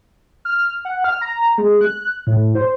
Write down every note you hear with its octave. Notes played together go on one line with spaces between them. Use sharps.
F6
F#5
F6
A#5
G#3
F#6
A2
C5